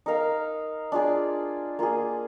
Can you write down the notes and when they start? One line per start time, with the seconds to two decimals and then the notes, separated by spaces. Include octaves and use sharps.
0.06 D#4 A#4 F5
0.92 D4 F4 G#4 D5
1.79 A#3 F4 G#4